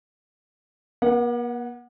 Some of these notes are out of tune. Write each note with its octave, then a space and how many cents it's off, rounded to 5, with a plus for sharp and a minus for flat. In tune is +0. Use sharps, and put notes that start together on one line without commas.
A#3 +45 F#5 -5